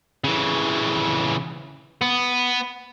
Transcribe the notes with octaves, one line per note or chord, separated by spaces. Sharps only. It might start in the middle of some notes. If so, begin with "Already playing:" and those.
C#3 E3
B3